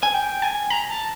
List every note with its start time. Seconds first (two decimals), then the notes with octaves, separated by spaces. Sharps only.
0.03 G#5
0.14 G5
0.42 G#5
0.70 A#5
0.90 A5